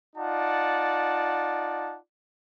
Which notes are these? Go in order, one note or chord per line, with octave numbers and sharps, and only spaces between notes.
D#4 F4 D5 F#5 A5